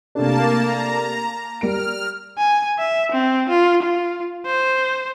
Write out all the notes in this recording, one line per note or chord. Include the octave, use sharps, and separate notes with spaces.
C3 A3 A#3 D4 A5
A#5
G3 A#4 F6 D7
G#5
E5
C4
F4
F4
C5